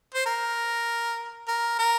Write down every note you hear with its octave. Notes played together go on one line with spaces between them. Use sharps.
C5
A#4
A#4
A#4